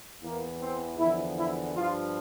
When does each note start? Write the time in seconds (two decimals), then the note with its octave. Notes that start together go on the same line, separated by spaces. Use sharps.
0.23 E2 E3 A#3
0.61 C4
0.98 E2 D3 F3 E4
1.37 E4
1.75 G2 F3 F4